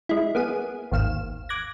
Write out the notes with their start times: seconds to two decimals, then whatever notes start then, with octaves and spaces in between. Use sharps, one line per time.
0.09 G#3 E4
0.35 A#3 B3 G#4 D#7
0.92 G#1 D#2 F5 E7
1.49 D6 F#6 G#6 A#6